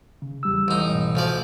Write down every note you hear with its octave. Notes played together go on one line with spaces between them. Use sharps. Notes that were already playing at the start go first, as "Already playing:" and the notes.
C#3
E2 G3 E6
A1 D#4
C#2 G#2 B2
D2 F3 D5